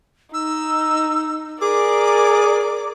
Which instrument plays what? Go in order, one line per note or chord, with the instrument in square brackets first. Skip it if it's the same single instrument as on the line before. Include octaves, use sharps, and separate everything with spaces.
[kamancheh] D#4 [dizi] E6
[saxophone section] G#4 [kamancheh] A#4 D5 [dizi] D6